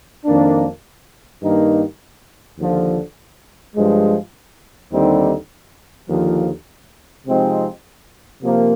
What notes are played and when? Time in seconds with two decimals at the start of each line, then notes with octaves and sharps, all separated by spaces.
0.25 F2 D#3 A#3 D4
1.41 G2 D#3 A#3 D#4
2.58 D#2 D3 F3
3.75 G2 F3 G#3
4.92 D#2 D3 G3 C4 D#4
6.09 D#2 D3 F3
7.25 C3 F3 G#3 C4 D#4
8.42 C3 F3 A#3